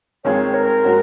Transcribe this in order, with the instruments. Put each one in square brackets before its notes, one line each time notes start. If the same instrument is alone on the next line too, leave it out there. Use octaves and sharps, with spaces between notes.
[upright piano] D#3 G#3 C4 F4 G#4 [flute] C#5
[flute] A#4
[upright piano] G#3 C#4 F#4